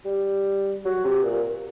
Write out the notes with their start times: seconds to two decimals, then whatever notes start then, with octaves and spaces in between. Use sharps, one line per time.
0.05 G3
0.85 F#3
1.04 C3
1.23 A#2